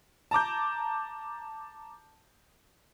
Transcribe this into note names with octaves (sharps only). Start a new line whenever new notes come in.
A5 A#5 D6 G6